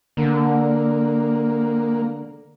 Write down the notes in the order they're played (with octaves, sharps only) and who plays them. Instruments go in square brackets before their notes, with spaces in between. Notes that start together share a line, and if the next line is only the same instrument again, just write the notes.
[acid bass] D3 [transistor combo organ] A#3